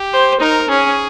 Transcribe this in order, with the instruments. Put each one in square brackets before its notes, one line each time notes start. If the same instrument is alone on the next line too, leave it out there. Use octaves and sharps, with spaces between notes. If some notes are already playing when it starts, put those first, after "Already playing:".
Already playing: [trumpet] G4
[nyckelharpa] C5
[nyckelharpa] D#4 [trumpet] A#4
[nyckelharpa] C#4 [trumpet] G#4